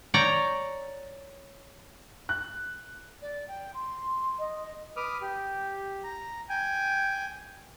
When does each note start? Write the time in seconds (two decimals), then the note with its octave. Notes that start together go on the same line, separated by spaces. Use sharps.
0.14 C#5 D5 G5 A#5
2.29 F#6
3.22 D5
3.48 G5
3.74 C6
4.39 D#5
4.97 B4 D6 D#6 F6
5.22 G4
6.04 A#5
6.49 G5 G#5